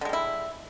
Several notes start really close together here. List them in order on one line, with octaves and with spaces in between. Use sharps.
D3 G#3 G3 E4